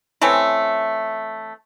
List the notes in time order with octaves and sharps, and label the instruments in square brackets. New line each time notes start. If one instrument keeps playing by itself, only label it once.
[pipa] E3 A3 C4 C#4